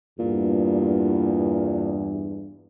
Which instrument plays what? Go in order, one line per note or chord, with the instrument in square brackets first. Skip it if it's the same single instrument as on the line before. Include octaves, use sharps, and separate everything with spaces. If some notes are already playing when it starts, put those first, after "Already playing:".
[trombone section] E2 G2 [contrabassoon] A#2